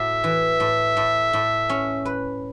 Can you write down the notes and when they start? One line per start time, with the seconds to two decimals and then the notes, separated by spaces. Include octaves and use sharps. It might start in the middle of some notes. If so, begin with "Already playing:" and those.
Already playing: A2 F#4 E5
0.24 E3
0.60 A2
0.97 A2
1.33 A2
1.69 C#4
2.05 B4